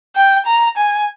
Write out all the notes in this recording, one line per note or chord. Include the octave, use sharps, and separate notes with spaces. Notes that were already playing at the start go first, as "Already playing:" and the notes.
G5
A#5
G#5